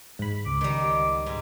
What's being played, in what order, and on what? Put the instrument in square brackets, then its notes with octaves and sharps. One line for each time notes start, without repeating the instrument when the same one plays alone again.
[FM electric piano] G#2 B5
[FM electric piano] C#2 [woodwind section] D6
[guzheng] D#3 G3
G#2